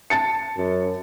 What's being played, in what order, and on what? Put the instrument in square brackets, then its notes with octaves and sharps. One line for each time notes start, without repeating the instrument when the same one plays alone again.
[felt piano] A5 A6 C#7
[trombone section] F#2